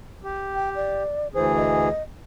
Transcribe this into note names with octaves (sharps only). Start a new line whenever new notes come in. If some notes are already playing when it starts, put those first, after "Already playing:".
G4
G5
D5
D2 E3 G#4 C5
D#5